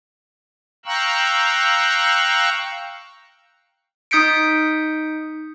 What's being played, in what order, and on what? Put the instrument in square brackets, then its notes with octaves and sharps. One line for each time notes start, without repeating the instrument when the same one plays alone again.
[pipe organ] F5 G5 A#5 C#6 E6 F#6
[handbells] D#4 D#6 G6 B6 C#7 D7